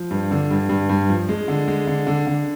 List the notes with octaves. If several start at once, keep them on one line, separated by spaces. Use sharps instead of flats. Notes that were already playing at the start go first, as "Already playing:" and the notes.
Already playing: F3
G2
D3
G2
G2
G2
F3
G#3
D3
G#3
D3
D3
D3